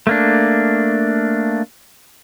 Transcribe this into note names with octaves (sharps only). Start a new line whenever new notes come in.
A3 A#3 D4